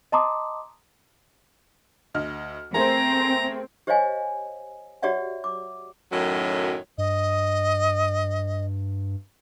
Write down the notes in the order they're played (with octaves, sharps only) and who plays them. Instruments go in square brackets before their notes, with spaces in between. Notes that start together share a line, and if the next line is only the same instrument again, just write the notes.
[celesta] D#5 A5 A#5 C6 D6 D#6
[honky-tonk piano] D2 D#5 F6
[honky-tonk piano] A3 G#4 A#4 [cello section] C4 [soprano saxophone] A#5
[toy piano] G4 C5 C#5 D#5 F5 G#5
F#4 G4 C#5 D5 E5 F#5
D6
[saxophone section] F#2 A2 D#3 F#3
[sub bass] G2 [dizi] D#5